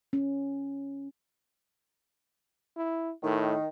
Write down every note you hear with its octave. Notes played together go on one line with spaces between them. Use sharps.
C#4
E4
A2 D#3